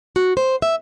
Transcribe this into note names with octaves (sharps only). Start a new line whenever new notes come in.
F#4
C5
E5